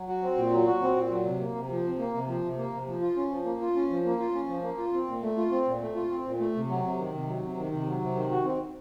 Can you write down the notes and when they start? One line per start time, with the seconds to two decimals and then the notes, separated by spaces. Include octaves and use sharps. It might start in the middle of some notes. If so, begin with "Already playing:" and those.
Already playing: F#3
0.08 F#4
0.22 C4
0.37 A#2
0.51 F#3
0.67 F#4
0.82 C4
0.96 A#2
1.11 F#3
1.25 C3
1.40 A#3
1.55 C3
1.70 F3
1.84 C3
1.99 A#3
2.14 C3
2.28 F3
2.43 C3
2.58 A#3
2.73 C3
2.87 F3
3.01 F4
3.16 C#4
3.30 F3
3.45 A#3
3.61 F4
3.76 C#4
3.90 F3
4.05 A#3
4.19 F4
4.35 C#4
4.48 F3
4.63 A#3
4.77 F4
4.93 C4
5.07 A#2
5.22 A3
5.37 F4
5.51 C4
5.66 A#2
5.81 A3
5.95 F4
6.11 C4
6.25 A#2
6.39 A3
6.55 C3
6.69 F#3
6.83 C3
6.98 D#3
7.14 C3
7.27 F#3
7.42 C3
7.57 D#3
7.71 C3
7.86 F#3
8.01 C3
8.16 D#3
8.31 F#4
8.45 C4